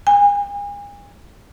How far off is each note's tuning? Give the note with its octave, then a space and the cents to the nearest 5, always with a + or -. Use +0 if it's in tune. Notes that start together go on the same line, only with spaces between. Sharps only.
G#5 -40